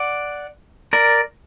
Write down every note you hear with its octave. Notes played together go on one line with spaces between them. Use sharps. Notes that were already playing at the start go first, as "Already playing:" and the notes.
Already playing: D5 F#5
A#4 D5